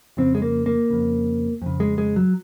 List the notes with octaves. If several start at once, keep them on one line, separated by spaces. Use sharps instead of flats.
F2 C#3 C4
G#3
A#3
A#3
F2 C#3
F2 C#3
G#3
G#3
F#3